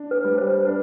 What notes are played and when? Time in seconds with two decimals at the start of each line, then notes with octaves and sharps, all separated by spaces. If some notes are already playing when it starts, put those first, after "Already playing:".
Already playing: D4
0.11 B4
0.24 G3
0.38 C5
0.65 D4 B4